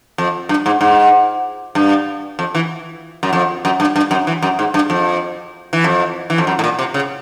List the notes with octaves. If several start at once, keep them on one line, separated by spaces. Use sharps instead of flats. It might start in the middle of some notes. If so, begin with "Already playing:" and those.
F2
G2
G#2
G#2
G2
F2
E3
F#2
F2
F#2
G2
G2
F#2
E3
F#2
G#2
G2
F2
E3
F2
E3
F2
F#2
A2
A#2
C3
C#3